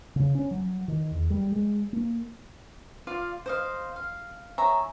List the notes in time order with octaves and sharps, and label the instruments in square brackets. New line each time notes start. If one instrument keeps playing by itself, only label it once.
[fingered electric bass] C#3
C#4
F#3
D#3
E2
G3
G#3
A#3
[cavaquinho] F4 D5 F5
C5 D#5 F5
F5
G#4 C#5 E5 A#5